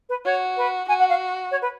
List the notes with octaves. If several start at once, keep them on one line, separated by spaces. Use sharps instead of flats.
B4
F#4 C#5
B4
F#4 G#5
F#5
F5
C#5
B4